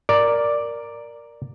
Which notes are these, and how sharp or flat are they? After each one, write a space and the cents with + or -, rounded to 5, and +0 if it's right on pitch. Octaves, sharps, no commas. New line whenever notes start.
A#4 +0 D5 +0